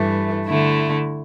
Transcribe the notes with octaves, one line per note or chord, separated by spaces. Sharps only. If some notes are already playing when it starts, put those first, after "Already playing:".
Already playing: G2 E3 A3
D3 A3 E4